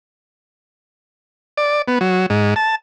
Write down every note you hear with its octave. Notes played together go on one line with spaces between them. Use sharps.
D5
B3
F#3
G#2
A5